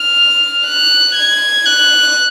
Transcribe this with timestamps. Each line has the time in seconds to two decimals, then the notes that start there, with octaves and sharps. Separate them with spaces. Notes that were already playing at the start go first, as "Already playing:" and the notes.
Already playing: F6
0.66 F#6
1.16 G#6
1.66 F#6